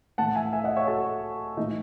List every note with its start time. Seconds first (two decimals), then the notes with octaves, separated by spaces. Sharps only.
0.18 A2 E3 F#5 A5
0.36 E5 G#5
0.53 E5 G#5
0.64 D#5 F#5
0.76 C#5 E5
0.87 F#4 A4
1.57 A2 E3 D#4